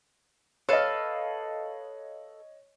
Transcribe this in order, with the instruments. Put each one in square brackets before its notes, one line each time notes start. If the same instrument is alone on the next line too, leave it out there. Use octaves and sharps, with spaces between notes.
[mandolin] A4 B4 F5 [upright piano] C#5 D#5